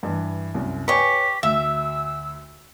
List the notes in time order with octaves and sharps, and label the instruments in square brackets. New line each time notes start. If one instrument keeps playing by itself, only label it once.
[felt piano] G2 E3
C2 F#2
[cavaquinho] G4 C#6 [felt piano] B4 C#5 G#5 [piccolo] B6
[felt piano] D2 [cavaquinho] E5 [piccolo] E6